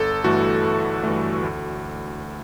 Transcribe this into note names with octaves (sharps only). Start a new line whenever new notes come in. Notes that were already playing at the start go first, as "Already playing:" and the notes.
Already playing: G1 A4
G2 E3 A3 F#4
G1
G2 E3 A3
D2